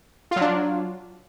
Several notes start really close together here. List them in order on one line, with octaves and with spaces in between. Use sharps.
F4 F#3 D4